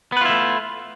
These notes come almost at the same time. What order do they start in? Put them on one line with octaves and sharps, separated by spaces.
B3 B4 F4 E4 A3